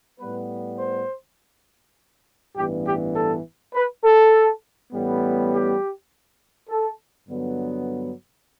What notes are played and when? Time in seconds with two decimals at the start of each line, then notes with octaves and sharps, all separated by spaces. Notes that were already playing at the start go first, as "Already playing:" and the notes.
0.20 A2 G3 B3 B4
0.79 C5
2.56 A1 G2 E3 B3 G4
2.86 G4
3.16 A4
3.74 B4
4.04 A4
4.93 A1 A2 G3 B3
5.52 G4
6.70 A4
7.29 G2 D3 F#3 B3